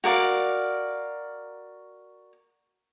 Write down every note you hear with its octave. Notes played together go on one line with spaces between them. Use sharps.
F#4 A#4 D5 F5